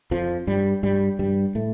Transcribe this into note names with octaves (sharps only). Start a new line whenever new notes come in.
F2 F3
G2 G3
G2 G3
G2 G3
A2 A3